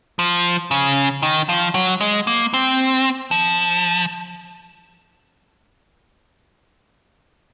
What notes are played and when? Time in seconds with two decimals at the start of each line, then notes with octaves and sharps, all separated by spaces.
0.19 F3
0.71 C#3
1.23 D#3
1.49 F3
1.75 F#3
2.01 G#3
2.27 A#3
2.54 C4
3.31 F3